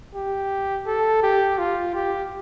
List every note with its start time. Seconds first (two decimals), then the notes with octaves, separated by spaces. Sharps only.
0.15 G4
0.87 A4
1.23 G4
1.58 F4
1.95 G4